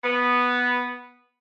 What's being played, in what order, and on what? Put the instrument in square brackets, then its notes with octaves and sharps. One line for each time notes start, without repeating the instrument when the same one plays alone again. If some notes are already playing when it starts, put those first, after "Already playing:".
[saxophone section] B3